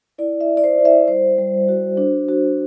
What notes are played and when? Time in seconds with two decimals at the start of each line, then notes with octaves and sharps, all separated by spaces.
0.18 E4 D5
0.41 E5
0.49 E4
0.57 D5
0.64 C5
0.79 E4
0.85 E5
1.08 G3 C5
1.38 G3
1.69 F#4
1.97 D4
2.28 F#4